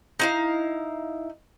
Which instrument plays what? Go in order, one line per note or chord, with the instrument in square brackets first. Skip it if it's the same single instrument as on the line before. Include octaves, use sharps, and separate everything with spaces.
[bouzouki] D#4 E4 F5